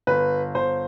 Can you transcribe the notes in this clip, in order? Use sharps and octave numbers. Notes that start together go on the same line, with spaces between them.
G1 B4
G1 C5